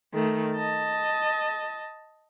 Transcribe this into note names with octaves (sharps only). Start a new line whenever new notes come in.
D#3 A3
D#5 A5